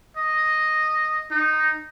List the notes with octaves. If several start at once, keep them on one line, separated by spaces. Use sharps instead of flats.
D#5
D#4